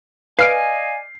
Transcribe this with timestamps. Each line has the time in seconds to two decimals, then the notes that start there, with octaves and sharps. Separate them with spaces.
0.39 B4 D5 D#5 F5 G#5 F6 C7 D7